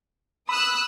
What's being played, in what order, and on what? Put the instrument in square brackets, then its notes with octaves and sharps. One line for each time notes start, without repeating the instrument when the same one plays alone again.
[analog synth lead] B5 [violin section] D#6 E6 F#6